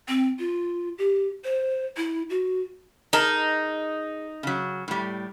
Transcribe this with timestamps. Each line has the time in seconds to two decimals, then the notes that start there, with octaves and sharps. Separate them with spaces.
0.08 C4
0.39 F4
0.98 G4
1.45 C5
1.97 E4
2.30 F#4
3.13 D#4 G#4 A#4 A5
4.43 C#3 F#3
4.88 A2 G3